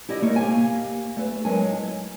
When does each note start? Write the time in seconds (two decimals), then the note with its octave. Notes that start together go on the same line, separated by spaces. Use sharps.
0.09 E4 G4 D5 D#5
0.21 C3 A3 A#3 C#5
0.36 A#3 G4 G#5
1.17 A3 B4
1.44 F#3 G#3 A#4 G#5 A5
1.73 E4